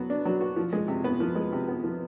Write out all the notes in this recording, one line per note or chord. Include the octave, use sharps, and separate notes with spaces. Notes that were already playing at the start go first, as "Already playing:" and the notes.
Already playing: F#3 B3
D4
F#3
F#4
F3
G#3
C3
B3
F3
G#3
C3
B3
F3